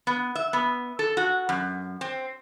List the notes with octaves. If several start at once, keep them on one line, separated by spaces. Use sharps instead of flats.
B3
E5
B3
A4
F#4
F#2
C4